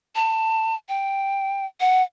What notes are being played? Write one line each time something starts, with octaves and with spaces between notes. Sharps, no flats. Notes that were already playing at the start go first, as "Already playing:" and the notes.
A5
G5
F#5